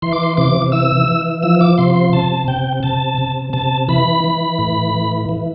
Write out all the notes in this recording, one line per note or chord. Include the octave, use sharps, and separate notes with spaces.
E3 C6
D6
C6
C3 D6
E3 E6
E3
F3 E6
D6
C3 C6
C6
C3 A5
C3 G5
C3 A5
C3
C3 A5
E3 B5
E3
A2
E3
E3